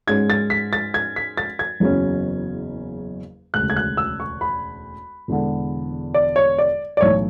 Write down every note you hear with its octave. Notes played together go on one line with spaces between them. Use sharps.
G#2 G#3 C#4 G#6
A6
B6
A6
G#6
B6
A6
G#6
F#1 E2 C#3 F#3 C#4
E1 D2 C#3 F#6
G#6
F#6
E6
C#6
B5
E1 E2 D3
D5
C#5
D5
D5
B1 A2 E3 C#5